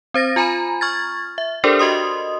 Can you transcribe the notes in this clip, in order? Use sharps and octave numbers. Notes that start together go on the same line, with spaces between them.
C4 C5 A6 A#6
F4 G#5 A#5 B5
C#6 F6 G#6 A6
E5
D4 G4 A4 A#4 C5 D5
F#4 D#5 C6 D#6